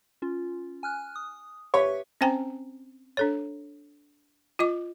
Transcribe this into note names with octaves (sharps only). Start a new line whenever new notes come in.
C#4 F4
G#5 F6 F#6
D#6
G4 B4 C#5 E5
C4 C#4 C5 G5 G#5 A#5
D4 A4 C#5
F4 D#5 D6